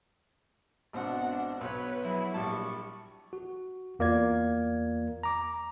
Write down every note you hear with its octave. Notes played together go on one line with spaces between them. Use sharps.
G#1 B2 C4 D4 F#5
D4
B1 B4 C#5 F#6
F#3 E4 G#4
A#1 G3 A5 C#6
F#4
E2 A#3 F4 D5 G#6
A#5 D6